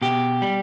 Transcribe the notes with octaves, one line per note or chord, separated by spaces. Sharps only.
B2 G4
G3